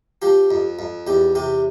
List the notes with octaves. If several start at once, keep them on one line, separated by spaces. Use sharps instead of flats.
F3 G4
F2
F2
E2 G4
C3 G4